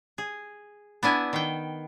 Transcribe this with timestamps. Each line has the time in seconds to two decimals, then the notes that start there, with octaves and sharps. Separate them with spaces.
0.18 G#4
1.03 B3 D4 E4 G#5
1.33 D#3 G5